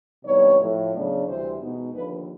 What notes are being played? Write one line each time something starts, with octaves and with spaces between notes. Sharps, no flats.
C3 E3 G3 B3 D#4 C#5
A2 F3 A3
C#3 F#3 B3 D4
D2 C3 E3 G3 C4 C5
B2 G#3 B3 D#4
D#2 D3 F3 B4